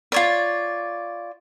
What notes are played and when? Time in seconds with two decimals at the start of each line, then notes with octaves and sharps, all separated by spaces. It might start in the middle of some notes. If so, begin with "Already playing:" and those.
0.12 F4 C#5 D5